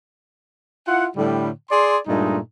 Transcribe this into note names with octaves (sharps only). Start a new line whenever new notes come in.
E4 F4 F#5
A2 D3 G3
G#4 D5 C6
G2 A#2 G#3 A3 D#4